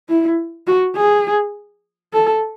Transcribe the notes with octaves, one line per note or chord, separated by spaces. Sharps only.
E4
F#4
G#4
A4